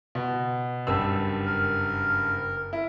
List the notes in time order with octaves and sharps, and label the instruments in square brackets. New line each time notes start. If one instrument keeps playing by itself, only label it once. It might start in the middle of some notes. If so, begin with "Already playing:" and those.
[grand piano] B2
F#1 G2 E6
[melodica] A#4
[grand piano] E4